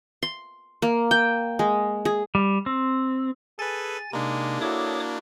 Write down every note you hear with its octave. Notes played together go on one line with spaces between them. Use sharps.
C6
A#3
G5
G#3
G#4
G3
C4
G#4 A4 B4 G#5 A6
C3 G#3 A#3 D4 D#4
E4 F#4 A4 C#5 D6 D#6